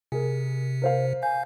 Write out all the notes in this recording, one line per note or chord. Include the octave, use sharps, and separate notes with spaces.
C3 G#4 A#4
A#4 C5 F5
F5 G#5 G6